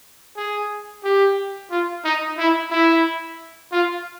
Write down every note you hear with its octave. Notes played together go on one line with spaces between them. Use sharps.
G#4
G4
F4
D#4
E4
E4
F4